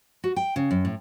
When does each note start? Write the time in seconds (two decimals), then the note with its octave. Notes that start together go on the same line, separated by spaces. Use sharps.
0.24 F#4
0.36 G5
0.56 C#3
0.71 F#2
0.85 A2